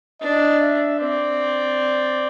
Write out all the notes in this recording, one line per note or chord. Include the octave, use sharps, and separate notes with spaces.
D4 D#5
E5
C4 D5